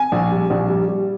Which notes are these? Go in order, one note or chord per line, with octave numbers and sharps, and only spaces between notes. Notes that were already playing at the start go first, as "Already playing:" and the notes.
Already playing: G#5
A#1
G3
A#1
G3
G3